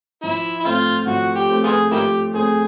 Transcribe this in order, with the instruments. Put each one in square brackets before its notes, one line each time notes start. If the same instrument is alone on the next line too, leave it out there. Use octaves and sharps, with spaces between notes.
[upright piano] F3 [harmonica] E4
[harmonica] E4
[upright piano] A3 C4 [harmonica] F4
[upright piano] F3 [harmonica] F#4
[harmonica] G4
[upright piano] A3 C4
[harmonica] B3 F4 G#4
[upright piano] F3 [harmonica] A#3 E4 G4
[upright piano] A3 C4 [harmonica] G#4